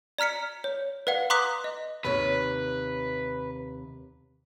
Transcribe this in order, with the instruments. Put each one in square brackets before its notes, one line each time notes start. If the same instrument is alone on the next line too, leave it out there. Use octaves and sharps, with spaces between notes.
[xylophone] D5 A#5 F6 B6 C#7
C#5
B4 D5 F5 F#5
A#5 C6 D6 D#6 F#6 B6
D#5
[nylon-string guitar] D#2 C3 C#5 [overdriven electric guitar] B4